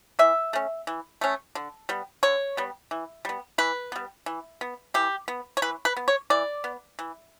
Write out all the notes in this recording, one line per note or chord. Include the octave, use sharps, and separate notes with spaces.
E3 E5
A3 C#4
E3
A3 C#4
D3
G3 B3
D3 C#5
G3 B3
E3
G3 B3
E3 B4
G3 B3
E3
B3
E3 G4
B3
C#5
E3 B4
B4
B3
C#5
E3 D5
B3
E3